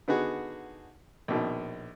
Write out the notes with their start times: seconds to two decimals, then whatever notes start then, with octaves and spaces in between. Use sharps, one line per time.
0.08 D3 B3 D#4 F#4 G#4
1.28 A#1 B2 D#3